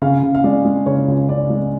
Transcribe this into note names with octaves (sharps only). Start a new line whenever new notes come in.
C#3 F5
C#3
F5
G#3 D5
G#3
C#3 C#5
C#2
C#3 D5
G#3